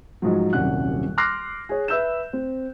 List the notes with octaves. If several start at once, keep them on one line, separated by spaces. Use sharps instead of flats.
G#2 F3 F#3
D#1 C2 F#2 F#5 F#6
C6 D6 F6 F#6 A#6 C7
G#4 C#5
B4 E5 E6 G6 E7
C4